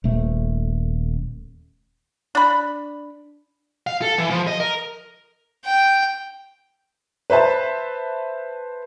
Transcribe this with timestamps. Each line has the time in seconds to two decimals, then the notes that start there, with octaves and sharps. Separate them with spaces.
0.04 D#1 A3
2.35 D4 B5
3.87 F5
4.02 A4
4.18 E3
4.30 F3
4.47 D#5
4.60 A#4
5.65 G5
7.30 B4 C5 E5 A5